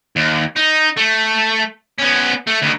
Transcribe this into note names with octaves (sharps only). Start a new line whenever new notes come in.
D#2
D#4
A3
B3 C#4
A3
D2 D#3